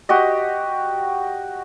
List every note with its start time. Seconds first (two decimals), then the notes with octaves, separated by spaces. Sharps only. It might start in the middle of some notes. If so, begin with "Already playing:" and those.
0.09 F#4 G4 D#5